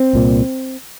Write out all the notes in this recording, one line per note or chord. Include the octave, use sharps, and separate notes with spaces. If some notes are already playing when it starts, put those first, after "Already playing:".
Already playing: C4
C2 A#2